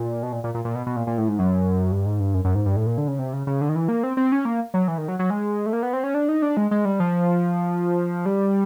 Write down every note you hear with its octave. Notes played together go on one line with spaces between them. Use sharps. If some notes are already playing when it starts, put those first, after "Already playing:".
Already playing: A#2
B2
A#2
A#2
A#2
A#2
B2
B2
A#2
A#2
A2
G#2
F#2
G2
G#2
G2
F#2
F#2
G#2
G2
A2
A#2
D3
C#3
C3
C#3
C#3
D3
D#3
E3
A#3
C4
C4
C#4
A#3
F#3
E3
D#3
F#3
F#3
G#3
A3
A#3
B3
C4
C#4
D4
D#4
D4
G#3
G#3
G3
F3
G3